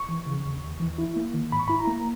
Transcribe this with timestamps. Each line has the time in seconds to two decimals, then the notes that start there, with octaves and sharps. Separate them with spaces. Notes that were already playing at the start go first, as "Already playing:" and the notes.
Already playing: C#6
0.09 E3
0.26 C#3
0.45 D#2
0.63 D#2
0.80 E3
0.98 E4
1.16 A#3
1.34 D#3
1.52 G#2 B5
1.60 C#6
1.68 E4 B5
1.79 A#5
1.87 A#3